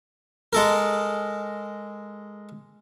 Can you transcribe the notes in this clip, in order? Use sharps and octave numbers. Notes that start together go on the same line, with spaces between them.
G#3 A4 A#4